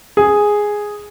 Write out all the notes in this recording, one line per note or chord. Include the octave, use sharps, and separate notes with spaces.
G#4